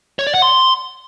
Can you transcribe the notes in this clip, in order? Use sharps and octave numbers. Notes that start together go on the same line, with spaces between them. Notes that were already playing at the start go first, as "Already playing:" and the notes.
C#5
D5
F#5
C6